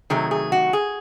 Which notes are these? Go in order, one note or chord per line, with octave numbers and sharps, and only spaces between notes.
C3 D#3 F#3 A3 G#4
G#4
F#4
G#4